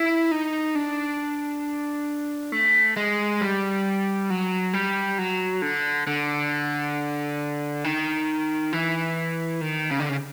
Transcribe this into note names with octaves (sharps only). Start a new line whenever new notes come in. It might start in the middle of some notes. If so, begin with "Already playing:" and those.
Already playing: E4
D#4
D4
A3
G#3
G3
F#3
G3
F#3
D3
D3
D#3
E3
D#3
C#3
D3
C#3